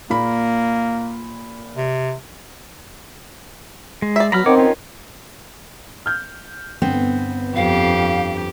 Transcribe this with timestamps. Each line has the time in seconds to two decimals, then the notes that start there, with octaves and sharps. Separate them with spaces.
0.10 A#2 A#3 B5
1.76 C3
4.02 G#3
4.16 D5 E5
4.32 F#3 B3 A#5 B5 F6
4.46 D#3 C4 C#5 F#5 D6
4.58 C#4 F4 C#5
6.06 F6 G6
6.82 G1 B3 C4
7.56 F2 G4 F5